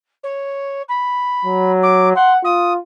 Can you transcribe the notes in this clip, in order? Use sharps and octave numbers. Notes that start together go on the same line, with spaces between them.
C#5
B5
F#3
D6
F#5 C6
F4 D#6